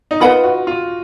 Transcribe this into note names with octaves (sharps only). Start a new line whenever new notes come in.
D#4
F4 B4 D#5 F#5 B5
F#4
F4